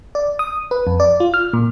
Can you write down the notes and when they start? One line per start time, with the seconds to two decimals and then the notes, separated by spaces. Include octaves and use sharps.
0.15 D5
0.39 D#6
0.71 B4
0.87 F2
1.00 D5
1.20 F4
1.34 F6
1.53 A#2